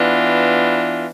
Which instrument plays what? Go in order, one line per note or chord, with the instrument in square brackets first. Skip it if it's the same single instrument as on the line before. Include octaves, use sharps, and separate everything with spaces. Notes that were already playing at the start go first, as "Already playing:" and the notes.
Already playing: [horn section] E3 B3 D4 F4